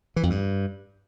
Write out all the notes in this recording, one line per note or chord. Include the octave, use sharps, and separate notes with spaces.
E3
F2
G2